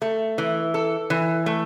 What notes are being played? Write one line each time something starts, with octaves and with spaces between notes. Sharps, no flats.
A3
E3
A4
E3
A3